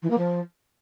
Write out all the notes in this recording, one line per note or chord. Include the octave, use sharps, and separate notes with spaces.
E3
A#3
F3